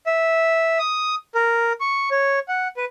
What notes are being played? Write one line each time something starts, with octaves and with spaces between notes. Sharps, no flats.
E5
D#6
A#4
C#6
C#5
F#5
B4